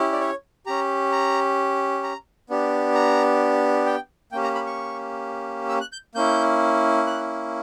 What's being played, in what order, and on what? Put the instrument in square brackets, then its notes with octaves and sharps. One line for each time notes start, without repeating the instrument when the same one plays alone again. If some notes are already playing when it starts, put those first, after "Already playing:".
Already playing: [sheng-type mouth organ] C#4 E4 G4
D5
C#5
C#4 G4 A#5
A#5
A#5
B3 D4 G4
A#5
G5
A#3 C#4 G4 G5
A#5
B5
C#6
E6
F#6
G6
A#3 C#4 E4 G6
F#6